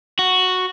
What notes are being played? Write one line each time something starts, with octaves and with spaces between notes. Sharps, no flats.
F#4